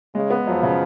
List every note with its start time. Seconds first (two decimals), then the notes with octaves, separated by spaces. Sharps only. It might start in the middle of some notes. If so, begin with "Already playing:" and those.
0.15 C#3 G#3
0.30 B3
0.47 F#2 F3
0.63 C#3